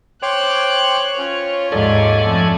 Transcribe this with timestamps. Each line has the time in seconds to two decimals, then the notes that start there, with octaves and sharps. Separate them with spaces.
0.23 C5 C#5 G5 C6 D6 F#6
1.18 C#4 F4
1.72 D#2 G#2 A4 D5 G#5
2.25 F2 A3